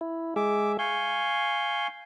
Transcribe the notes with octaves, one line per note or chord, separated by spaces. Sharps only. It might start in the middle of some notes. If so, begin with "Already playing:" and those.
E4
G#3 G#4 E5 D6
F5 G#5 C#6 G6